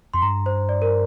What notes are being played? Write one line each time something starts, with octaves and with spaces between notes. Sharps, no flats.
F2 C6
G2 A#5
C5
D5
A#4